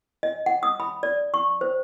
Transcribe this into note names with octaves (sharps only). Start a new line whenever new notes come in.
D#5
F#5
D#6
B5
D5
C#6
C5